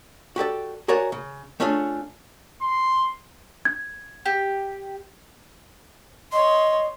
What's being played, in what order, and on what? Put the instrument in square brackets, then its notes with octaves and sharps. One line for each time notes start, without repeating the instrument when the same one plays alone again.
[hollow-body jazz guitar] F#4 G4 A4 D5
F#4 G#4 A#4 C#5 D5 F#5
C#3
A3 C#4 D4 F4 G#4
[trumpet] C6
[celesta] G#6
[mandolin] G4
[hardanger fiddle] C#5 C6 [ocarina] D#5